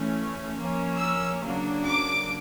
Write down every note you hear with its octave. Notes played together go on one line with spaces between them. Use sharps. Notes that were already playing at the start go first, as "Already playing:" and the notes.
Already playing: E3 A3 C#4
F3 A#3 C#4
E6
C#3 F#3 A#3 D4
D6